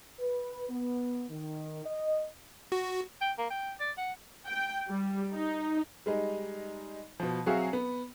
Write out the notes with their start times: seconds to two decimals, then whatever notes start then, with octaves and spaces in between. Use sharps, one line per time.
0.20 B4
0.70 B3
1.30 D#3
1.85 D#5
2.72 F#4
3.21 G5
3.38 A#3
3.50 G5
3.80 D5
3.98 F#5
4.47 G5
4.89 G3
5.33 D#4
6.06 G3 G#3 D#4
7.20 B2 F3
7.46 F#3 C4 F#4 G#4 E5 F5
7.73 B3